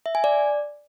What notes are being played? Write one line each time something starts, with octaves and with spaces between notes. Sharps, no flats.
E5
G#5
D5